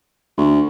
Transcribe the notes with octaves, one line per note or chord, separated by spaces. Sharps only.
D2